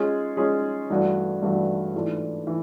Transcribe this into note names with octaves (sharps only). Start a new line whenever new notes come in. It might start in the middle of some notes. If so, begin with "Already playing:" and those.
Already playing: G#3 C#4 F4 G#4
G#3 C#4 F4 G#4
G2 E3 A3 D4 F#4
G2 E3 A3 D4 F#4
G#2 E3 A3 D4 F4
E3